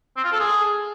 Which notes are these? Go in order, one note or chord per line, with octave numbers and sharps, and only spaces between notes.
C4
F4
A4
G#4